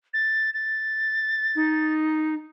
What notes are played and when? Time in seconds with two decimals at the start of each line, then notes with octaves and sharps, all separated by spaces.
0.14 A6
0.54 A6
1.56 D#4